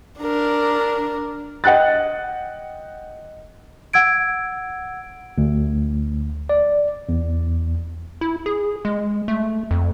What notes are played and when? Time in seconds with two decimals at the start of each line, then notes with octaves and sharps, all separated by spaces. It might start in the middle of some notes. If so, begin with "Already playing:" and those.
0.19 D4 A#4
1.64 D#5 F#5 G5 F#6 A6
3.93 F#5 E6 G#6 D7
5.38 D2
6.49 D5
7.09 E2
8.21 E4
8.46 G#4
8.85 G#3
9.28 A3
9.71 F2